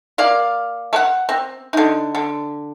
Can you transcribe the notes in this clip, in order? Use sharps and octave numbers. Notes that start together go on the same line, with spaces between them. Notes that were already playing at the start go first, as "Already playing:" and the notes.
A#3 D5 F5
A3 F#5
C4
D3 D#4
D3